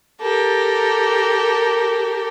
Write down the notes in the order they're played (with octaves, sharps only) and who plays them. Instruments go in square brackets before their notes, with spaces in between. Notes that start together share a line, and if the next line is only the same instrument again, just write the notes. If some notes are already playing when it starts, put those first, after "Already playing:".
[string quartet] G4 A4 A#4